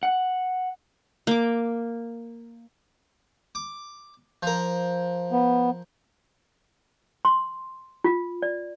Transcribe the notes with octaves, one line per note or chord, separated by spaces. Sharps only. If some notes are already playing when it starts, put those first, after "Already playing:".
F#5
A#3 D6
D6
F3 A#4
B3
C6
F4
D5